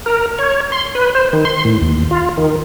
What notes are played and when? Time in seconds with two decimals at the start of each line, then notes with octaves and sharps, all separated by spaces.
0.06 A#4
0.39 C#5
0.72 C6
0.95 B4
1.15 C5
1.33 D#3
1.45 C6
1.65 A2
1.81 D#2
2.11 F4
2.37 D#3